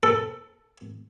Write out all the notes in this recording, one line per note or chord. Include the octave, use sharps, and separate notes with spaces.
A4